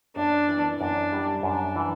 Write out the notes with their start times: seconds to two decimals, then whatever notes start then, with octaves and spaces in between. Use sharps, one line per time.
0.16 F#2 D4
0.49 E3
0.80 F#2 D4
1.12 G3
1.43 F#2 D4
1.76 E3